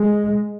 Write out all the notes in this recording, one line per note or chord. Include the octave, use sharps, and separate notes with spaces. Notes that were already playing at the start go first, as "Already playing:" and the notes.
Already playing: G#3